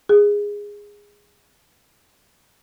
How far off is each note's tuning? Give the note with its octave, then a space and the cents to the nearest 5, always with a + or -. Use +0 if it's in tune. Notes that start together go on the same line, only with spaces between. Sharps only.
G#4 -15